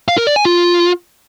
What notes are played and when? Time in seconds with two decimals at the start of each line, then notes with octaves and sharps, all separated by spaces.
0.08 F5
0.18 A#4
0.27 D5
0.36 G#5
0.45 F4